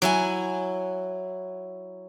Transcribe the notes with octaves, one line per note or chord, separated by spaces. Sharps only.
F#3 E4 G#5